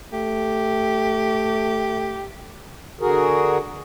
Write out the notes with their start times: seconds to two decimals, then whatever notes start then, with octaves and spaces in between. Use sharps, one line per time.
0.13 A3 G4
3.01 D3 F#4 G#4 A#4